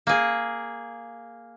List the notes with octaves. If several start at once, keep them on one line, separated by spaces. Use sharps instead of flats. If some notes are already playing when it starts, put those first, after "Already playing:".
A#3 G#4